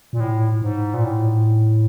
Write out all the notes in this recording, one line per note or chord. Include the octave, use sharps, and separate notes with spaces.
A#2
A2
G#2
A#2
A2